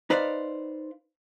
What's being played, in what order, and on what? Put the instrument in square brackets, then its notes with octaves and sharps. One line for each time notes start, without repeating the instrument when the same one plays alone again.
[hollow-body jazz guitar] D#4 B4 C5 D5 F5